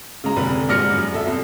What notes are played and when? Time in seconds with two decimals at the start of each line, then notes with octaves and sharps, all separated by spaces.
0.24 C#3 G#3 A#5
0.36 F1 D3 B4
0.69 G#2 G3 D5 F6 A#6 C#7
0.93 F#2
1.14 A4 E5
1.27 C2